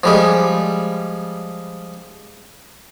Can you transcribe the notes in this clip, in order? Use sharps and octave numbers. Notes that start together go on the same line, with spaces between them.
F3 G3 G#3